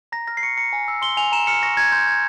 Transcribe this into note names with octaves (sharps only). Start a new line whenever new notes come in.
A#5 A#6
F6 A#6
C7
C#6 C#7
A#5 C#7
G#5
E6
C6 G7
G#5 F7
A#5 E7
F6 C#7
C#6 A#6
A#5 G#6
C6 G6
C6 G#6